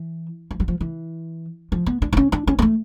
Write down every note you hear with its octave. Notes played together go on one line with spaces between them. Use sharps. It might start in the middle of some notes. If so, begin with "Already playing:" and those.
Already playing: E3
F3
F#3
F3
E3
F3
B3
D4
D4
C#4
D4
C#4
A#3
A3